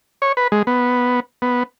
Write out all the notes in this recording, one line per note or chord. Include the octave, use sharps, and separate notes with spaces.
C#5
B4
G#3
B3
B3